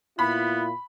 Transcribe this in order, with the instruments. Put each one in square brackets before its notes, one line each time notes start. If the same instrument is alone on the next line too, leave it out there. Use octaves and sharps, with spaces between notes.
[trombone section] A#2 E4 F4 [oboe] B3 [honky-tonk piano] B5